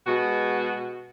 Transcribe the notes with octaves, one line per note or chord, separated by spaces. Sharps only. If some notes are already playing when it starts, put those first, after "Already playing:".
B2 G#3 F#4